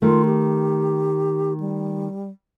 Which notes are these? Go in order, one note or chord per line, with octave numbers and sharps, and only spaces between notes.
D#3 A3 F4
G4
G3